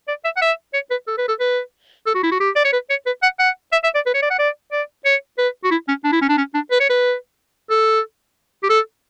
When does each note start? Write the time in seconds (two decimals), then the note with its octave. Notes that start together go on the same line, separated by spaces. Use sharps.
0.08 D5
0.25 E5
0.37 F#5
0.41 E5
0.74 C#5
0.91 B4
1.08 A4
1.18 B4
1.28 A4
1.40 B4
2.07 A4
2.15 F#4
2.23 E4
2.32 F#4
2.40 G4
2.56 D5
2.65 C#5
2.73 B4
2.90 C#5
3.06 B4
3.23 F#5
3.39 F#5
3.72 E5
3.84 E5
3.95 D5
4.06 B4
4.14 C#5
4.22 D5
4.30 F#5
4.39 D5
4.72 D5
5.05 C#5
5.38 B4
5.64 F#4
5.71 E4
5.88 C#4
6.04 D4
6.13 E4
6.22 C#4
6.29 D4
6.38 C#4
6.54 D4
6.71 B4
6.80 C#5
6.90 B4
7.70 A4
8.63 G4
8.70 A4